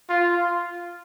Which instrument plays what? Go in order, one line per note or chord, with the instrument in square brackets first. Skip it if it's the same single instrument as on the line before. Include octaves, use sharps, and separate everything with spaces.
[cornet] F4